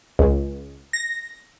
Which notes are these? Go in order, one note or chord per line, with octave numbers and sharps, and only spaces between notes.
C#2
A#6